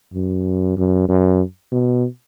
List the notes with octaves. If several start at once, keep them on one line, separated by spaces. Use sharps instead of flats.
F#2
F#2
F#2
B2